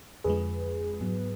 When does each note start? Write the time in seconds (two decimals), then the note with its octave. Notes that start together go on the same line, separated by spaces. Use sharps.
0.24 F2 D3 F3 G#3 G#4 B4
1.00 G#2 F#3 B3